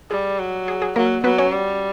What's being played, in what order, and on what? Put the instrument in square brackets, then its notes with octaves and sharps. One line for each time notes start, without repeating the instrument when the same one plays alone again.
[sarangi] G3 [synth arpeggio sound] G#4
[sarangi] F#3
[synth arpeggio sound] G#4
G#4
[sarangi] F#3 [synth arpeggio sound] A#3 A#4
[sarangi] F#3 [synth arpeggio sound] B3 B4
[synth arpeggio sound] C#4 C#5
[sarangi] G3